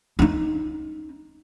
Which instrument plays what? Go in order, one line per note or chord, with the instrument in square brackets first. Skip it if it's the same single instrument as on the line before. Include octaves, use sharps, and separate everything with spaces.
[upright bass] C#4 D#4